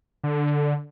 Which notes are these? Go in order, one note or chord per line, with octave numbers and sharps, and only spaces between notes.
D3